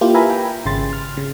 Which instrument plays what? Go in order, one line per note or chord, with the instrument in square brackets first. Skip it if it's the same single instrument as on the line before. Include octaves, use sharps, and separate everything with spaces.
[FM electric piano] A#3 E4 F4 G4
B4 E5 F5 G#5 A#5 B5
G5
G#1 C#3 C6 A6
F6
C#3